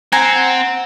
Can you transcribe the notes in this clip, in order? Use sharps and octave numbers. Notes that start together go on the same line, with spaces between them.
C4 F#5 G#5 A#5